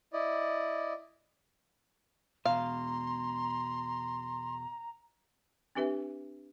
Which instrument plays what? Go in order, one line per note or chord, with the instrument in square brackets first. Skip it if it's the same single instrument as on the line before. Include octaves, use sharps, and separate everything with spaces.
[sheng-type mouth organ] E4 D5 D#5
[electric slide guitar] E2 B2 [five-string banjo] F5 [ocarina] A#5 [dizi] C6
[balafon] C4 D4 G4 B4 E5